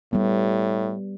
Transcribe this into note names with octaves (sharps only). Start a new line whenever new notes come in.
A2 G3 B3